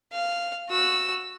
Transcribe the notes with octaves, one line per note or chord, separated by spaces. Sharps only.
F5
F#4 E6